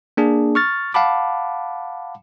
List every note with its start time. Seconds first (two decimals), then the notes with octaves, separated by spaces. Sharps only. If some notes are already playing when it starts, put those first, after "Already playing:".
0.17 A#3 D4 G#4
0.55 C#6 F6 A6
0.94 F5 F#5 A5 B5 D6